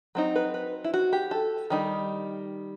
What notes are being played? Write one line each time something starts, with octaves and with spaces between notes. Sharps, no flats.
F#3 C4 D#4
B4
B4
E4
F#4
G4
A4
D#3 G3 D#4